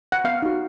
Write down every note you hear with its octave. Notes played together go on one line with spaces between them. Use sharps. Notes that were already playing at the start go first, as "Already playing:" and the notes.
F#5
B3 F5
D#4 F#4